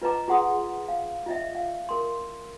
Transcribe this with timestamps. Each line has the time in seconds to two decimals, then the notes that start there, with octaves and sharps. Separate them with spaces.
0.02 F4 B4 D#5 A#5 D6
0.28 F4 G#4 F#5 C6 D#6
0.88 F5
1.26 F4 D#5 E5
1.55 F5
1.89 A#4 C6